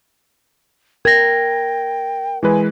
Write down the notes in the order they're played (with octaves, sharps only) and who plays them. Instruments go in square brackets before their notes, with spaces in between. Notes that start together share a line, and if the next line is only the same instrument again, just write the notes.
[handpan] A#4 [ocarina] G5 [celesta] G#6 A#6
[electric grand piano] E3 G#3 B4 [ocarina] G#5